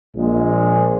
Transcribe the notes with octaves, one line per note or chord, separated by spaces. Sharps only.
A#1 A#2 G#3